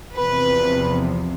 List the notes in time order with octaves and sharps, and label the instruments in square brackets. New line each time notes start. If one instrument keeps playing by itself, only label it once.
[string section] E2 C3 F3 B4